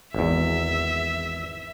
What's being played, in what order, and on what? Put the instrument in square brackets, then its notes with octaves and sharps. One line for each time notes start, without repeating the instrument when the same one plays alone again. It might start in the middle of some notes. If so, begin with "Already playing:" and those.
[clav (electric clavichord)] G#1 E2 [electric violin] E5